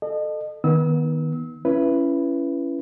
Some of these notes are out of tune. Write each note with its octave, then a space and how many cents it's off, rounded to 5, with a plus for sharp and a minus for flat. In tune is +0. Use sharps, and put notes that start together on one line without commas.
A4 +0 D#5 -35
D#3 +0 B3 -25 E6 -40
C#4 +0 E4 +25 B4 +0